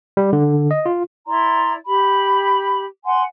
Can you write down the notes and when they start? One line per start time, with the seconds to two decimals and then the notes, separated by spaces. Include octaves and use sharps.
0.17 G3
0.33 D3
0.71 D#5
0.86 F4
1.27 E4 D5 A#5 C6
1.86 G4 B5
3.05 F#5 G#5 C6